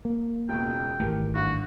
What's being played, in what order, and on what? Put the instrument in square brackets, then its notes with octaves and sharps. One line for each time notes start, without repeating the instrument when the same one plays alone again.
[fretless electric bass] A#3
[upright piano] E1 C#2 B2 [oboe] G5
[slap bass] G#1 A3 [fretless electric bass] E3 [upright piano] G4 A#4
[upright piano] G2 [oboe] F#4